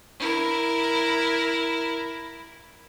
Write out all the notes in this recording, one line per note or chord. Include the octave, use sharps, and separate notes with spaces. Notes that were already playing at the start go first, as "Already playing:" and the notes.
E4 A#4